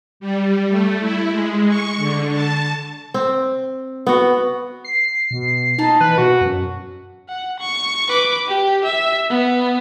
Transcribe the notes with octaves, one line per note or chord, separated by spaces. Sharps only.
G3
A3
E4
G#3
C#6
D3
A5
C4
B3 F#4
C7
B2
A#3 D#4 A4 A5
E3 B4
B2 F#4
F#2
F#5
C#6
B4 D6
G4
E5
B3